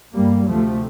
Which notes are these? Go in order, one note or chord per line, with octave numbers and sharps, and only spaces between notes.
G1 G2 G3 A#3
D2 C3 F3 A3